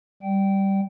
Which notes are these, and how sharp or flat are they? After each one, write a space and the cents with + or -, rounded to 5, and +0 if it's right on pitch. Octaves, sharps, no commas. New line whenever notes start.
G3 +0 G5 -20